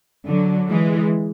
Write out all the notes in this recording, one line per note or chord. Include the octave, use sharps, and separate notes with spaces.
D3 F#3
E3 G#3